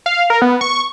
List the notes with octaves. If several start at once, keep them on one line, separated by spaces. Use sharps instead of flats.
F5
A#4
B3
C#6